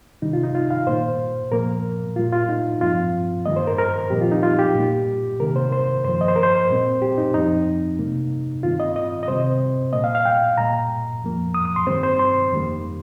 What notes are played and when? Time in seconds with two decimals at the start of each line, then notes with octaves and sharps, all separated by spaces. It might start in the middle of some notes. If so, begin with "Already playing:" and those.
0.22 C3 D#3 G3 D#4
0.33 F4
0.44 D#4
0.55 F4
0.71 F5
0.87 A#2 A#3 C5
1.52 A#2 F3 A#3 A#4
2.16 A#2 G3 A#3 F4
2.32 F4
2.49 D#4
2.81 G2 F3 C4 F4
3.46 G2 D#3 G3 A#3 D#5
3.56 C5
3.67 A#4
3.79 A#4
4.10 A#2 F3 C4 G4
4.21 F4
4.32 D#4
4.43 F4
4.59 G4
4.75 A#2 G3 A#3
5.40 C3 D#3 A#3 A#4
5.56 C5
5.72 C5
6.04 G2 F3 A#3 C5
6.21 D#5
6.28 C5
6.36 A#4
6.43 C5
6.69 A#2 G3 C4
7.02 G4
7.18 D#4
7.34 F2 F3 C4 D#4
7.99 C3 G3 A#3
8.63 G2 D#3 C4 F4
8.80 D#5
8.96 D#5
9.23 D#5
9.28 C3 G3 C4 C5
9.93 A#2 A#3 D#5
10.04 F5
10.15 F5
10.25 G5
10.58 A#2 G3 A#3 A#5
11.22 F2 F3 A#3
11.54 D#6
11.65 D#6
11.76 C6
11.87 G2 D#3 G3 C4 C5
12.03 C5
12.19 C6
12.52 F2 D#3 G3 A#3